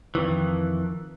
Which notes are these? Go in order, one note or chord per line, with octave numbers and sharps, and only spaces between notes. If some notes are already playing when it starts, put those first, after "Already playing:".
F2 D#3 E3